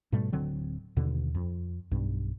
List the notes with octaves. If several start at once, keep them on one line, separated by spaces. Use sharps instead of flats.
G#2 B2 G3 A3
D1 D3 F#3 C4
D#2 B2 D3
F2
B1 G2